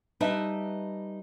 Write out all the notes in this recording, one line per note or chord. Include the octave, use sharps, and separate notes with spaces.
G3 D#4 B4 D#5 E5 A5